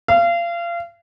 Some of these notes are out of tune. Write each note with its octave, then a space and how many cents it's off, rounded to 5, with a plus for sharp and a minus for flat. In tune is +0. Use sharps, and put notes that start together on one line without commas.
F5 -30